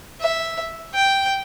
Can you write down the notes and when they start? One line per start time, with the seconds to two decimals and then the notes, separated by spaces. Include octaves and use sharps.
0.21 E5
0.94 G5